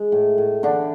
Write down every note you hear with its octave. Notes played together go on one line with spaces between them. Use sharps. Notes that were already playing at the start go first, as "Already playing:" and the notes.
Already playing: G#3
A2
A2
D3 E3 D4